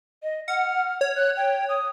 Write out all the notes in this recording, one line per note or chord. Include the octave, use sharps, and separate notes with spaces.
D#5
F#5 F6
C#5
F#6
G5
D#6